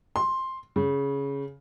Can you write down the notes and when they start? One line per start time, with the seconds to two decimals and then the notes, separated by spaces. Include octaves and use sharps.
0.16 C6
0.76 C#3